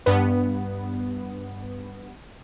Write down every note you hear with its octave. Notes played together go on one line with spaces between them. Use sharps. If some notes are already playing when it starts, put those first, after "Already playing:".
G2 B3